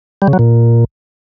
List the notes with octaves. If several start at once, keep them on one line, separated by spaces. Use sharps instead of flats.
G3
C#3
F#3
A#2